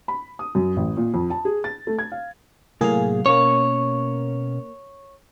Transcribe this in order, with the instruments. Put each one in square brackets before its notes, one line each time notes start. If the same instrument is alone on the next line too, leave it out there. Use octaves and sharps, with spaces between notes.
[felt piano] B5
D#6
F#2
A1
A#2
F2
A5
G#4
A6
A3
G#6
F5
[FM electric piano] A2 A#3 G#4 [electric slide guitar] C3 F#3 F5
[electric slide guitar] B2 C#4 A#4 [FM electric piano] A#3 C#6 [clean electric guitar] C#5